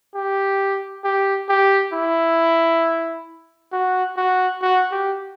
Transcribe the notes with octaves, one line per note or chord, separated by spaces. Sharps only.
G4
G4
G4
E4
F#4
F#4
F#4
G4